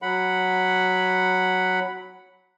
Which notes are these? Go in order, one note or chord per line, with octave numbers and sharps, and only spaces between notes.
F#3 F#5 B5